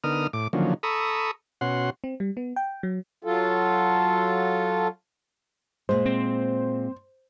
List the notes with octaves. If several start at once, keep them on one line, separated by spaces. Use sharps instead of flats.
D3 B3 D#4 A#4 D#6 F6
A2 D6
D3 D#3 F3 F#3 A#3 C#4
A4 A#5 B5 C#6 D#6 E6
B2 C#4 F#4 F#5 C6
C4
G3
B3
G5
F#3
F#3 F4 A4
A#2 G#3 C5
C4